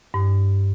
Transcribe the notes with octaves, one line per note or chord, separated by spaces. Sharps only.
G2